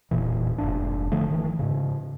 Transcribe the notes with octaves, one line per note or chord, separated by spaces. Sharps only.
E1 A#2 E3
F1 A#1 G#2 D4
D3 F3 A3
D#3 E3
G#2 C#3